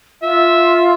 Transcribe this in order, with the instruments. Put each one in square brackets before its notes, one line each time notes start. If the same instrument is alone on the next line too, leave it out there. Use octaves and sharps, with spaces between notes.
[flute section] F4 [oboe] E5